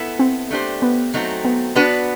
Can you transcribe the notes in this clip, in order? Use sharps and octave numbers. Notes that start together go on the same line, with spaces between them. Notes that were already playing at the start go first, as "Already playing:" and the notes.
Already playing: B3 E4 A4
C4
A3 D4 G4 C5
B3
F#3 A3 C4 D#4 F#4
B3
B3 D4 F#4 B4